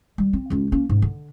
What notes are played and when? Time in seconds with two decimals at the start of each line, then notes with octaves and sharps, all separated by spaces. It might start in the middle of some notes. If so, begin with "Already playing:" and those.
0.18 G3
0.33 C4
0.50 C#2 F4
0.72 A#3 C#4
0.89 G#2
1.02 D3